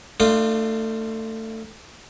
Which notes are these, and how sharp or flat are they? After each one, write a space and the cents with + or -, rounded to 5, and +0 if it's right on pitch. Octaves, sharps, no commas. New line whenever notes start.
A3 +20 D4 +40 F4 -5